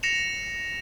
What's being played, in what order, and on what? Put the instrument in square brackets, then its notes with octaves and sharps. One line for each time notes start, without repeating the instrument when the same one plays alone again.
[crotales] A#6 C#7 E7 F7